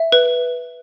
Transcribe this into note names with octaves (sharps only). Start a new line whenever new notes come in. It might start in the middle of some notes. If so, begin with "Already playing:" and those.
Already playing: E5
B4